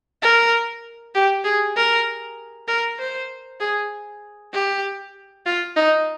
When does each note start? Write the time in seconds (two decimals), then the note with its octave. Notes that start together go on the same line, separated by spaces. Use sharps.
0.22 A#4
1.15 G4
1.44 G#4
1.76 A#4
2.68 A#4
2.99 C5
3.60 G#4
4.53 G4
5.46 F4
5.76 D#4